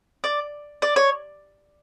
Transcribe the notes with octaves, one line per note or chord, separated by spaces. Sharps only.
D5
D5
C#5